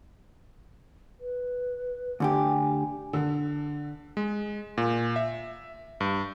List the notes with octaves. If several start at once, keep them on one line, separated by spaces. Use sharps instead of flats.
B4
D2 D3 G4 G#5
D3
G#3
A#2
E5
G2